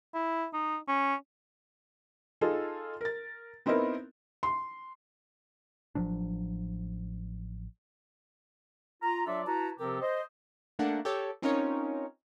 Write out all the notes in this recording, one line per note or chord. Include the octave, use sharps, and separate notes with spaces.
E4
D#4
C#4
D#4 F4 G#4 A4
A#4 A6
B3 C4 D#4 E4 A#4
C6
A1 F3 F#3 D4
F4 A#5
F#3 D4 F4 A4 D5 E5
E4 F#4 B4 A5 A#5
C3 F3 C4 G4 A4 A#4
C5 D#5
A3 A#3 D4 F#5
G4 A4 C#5
C4 C#4 D#4 F4 A#4 C#5